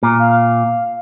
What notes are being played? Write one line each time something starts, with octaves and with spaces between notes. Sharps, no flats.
A#2
F5